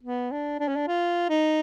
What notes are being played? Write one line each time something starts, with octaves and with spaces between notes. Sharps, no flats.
B3
D4
D4
C#4
D4
F4
D#4